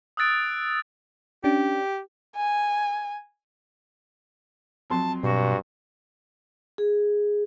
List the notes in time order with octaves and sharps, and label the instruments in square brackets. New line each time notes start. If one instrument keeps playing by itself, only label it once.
[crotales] D#6 E6 F#6 A6 D7
[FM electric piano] C#4 D4 [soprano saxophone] G4
[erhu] G#5
[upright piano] F2 F#3 C6 [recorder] A5
[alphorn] G2 [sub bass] B2 [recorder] F#4
[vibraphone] G#4